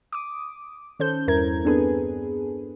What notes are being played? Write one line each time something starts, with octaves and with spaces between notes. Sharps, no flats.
D6 D#6
D#3 C#4 A4 C5 G6
E2 G2 E4 A#4 A#5 G#6
B3 C4 D4 G#4 A4 B4